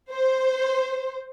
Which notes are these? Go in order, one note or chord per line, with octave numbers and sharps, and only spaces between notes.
C5